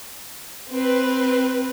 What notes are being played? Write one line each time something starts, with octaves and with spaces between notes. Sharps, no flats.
C4 B4